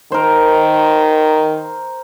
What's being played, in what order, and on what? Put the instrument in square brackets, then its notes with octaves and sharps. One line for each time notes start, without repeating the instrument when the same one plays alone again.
[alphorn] D#3 [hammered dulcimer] A#4 C5